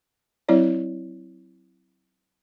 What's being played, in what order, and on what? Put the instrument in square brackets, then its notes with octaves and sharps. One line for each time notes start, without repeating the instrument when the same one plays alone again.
[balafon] F#3 C4 E4 C#5 D5